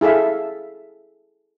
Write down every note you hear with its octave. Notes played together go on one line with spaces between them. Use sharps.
E4 G#4 A4 E5 F5